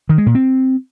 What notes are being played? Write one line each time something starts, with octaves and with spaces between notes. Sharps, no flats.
D#3
G#3
A#2
C4